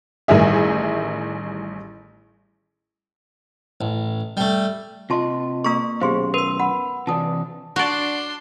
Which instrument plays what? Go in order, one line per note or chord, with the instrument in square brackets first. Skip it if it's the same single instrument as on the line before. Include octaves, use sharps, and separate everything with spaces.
[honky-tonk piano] A1 D#3 G3 G#4 E5
[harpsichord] A1
G3 A3
[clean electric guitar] C3 D#5 [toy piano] F4 A5 C6
[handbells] A#3 C#6 [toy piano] G#4 A#5 E6
[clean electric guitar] F#2 B2 [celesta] G4 G#4 C5 [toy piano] F5 C6
[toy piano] A#4 [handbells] B4 E6 [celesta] C6 D#7
[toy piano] F#5 [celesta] B5
[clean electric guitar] C3 E3 D5 [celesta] A5 D#6
[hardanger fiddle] D4 C6 [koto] F#4 D5